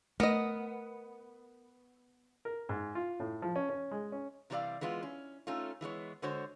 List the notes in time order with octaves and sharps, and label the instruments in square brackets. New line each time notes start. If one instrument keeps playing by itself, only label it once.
[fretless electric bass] A3 [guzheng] B3 [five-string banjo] A#4 D#5
[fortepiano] A#4
G#2
F4
A2
F3
C#4
C#4
G#3
C#4
[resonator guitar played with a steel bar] C3 E3 G3 A4 D5 F5
E3 G#3 B3 F4
C#4
A3 C#4 D#4 F4
E3 G#3 B3 C#5
D3 G#3 F#4 C5 C#5